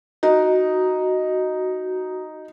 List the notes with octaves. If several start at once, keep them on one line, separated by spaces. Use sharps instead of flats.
D#4 F#4